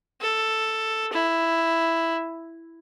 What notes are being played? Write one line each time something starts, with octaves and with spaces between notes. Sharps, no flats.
A4
E4